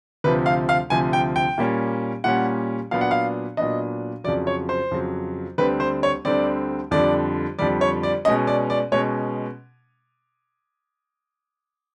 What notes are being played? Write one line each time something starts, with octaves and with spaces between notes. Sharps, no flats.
D2 C3 F3 B4
F5
F5
D2 C3 F3 G#5
G5
G5
A#2 G3 A#3 C#4
A#2 G3 A#3 C#4 F#5
A#2 F#3 B3 D4 F5
F#5
F5
A#2 F#3 B3 D4 D#5
F2 C#3 F#3 D5
C#5
C5
F2 C#3 F#3
D2 D3 G3 C4 B4
C5
C#5
D2 D3 G3 C4 D5
F2 D3 G3 D5
F2 D3 G3 D5
C#5
D5
B2 G#3 C#4 D#5
D5
D5
B2 G#3 C#4 C#5